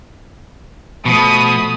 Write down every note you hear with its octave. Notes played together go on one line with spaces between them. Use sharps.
B2 F3 A3 B5 D#6